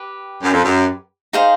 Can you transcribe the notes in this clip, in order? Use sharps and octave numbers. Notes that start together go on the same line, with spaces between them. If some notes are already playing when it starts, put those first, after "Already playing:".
Already playing: G4 B4
F#2
F2
F#2
D#4 G#4 C5 F5